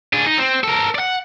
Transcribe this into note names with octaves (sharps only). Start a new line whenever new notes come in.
D4 G#4
D#4
C4
A4 A#4
D5 F#5